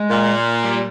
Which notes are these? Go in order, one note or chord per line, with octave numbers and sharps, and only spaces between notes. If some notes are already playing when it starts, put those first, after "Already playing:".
Already playing: G#3
A#2
G3